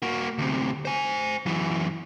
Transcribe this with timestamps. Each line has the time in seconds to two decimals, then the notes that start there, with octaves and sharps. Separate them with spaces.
0.02 A#3 F#4
0.38 D2 C3
0.85 C5 G#5
1.46 F#2 E3